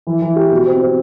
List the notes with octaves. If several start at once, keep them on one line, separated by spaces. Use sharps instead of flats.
E3
E3
G4
B2
C4
C4